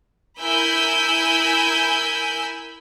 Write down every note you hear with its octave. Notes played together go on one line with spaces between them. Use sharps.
E4 A#4 G#5 B5 E6 G6